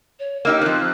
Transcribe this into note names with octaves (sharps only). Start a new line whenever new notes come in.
C#5
A#3 D#4 G4 E6
F3 C4 F#6